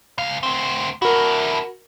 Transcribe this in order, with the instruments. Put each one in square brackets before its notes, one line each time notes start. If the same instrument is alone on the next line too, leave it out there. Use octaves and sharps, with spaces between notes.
[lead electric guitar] C#2 F5
D2 C4
[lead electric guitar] D4 E4 [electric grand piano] F#4 A#4